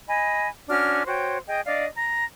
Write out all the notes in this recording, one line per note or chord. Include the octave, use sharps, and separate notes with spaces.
D#5 G#5 B5
C#4 D4 F#4 F6
F#4 C5 C#5 G5
G#4 D#5 G5
D4 D5 D#5 F5
A#5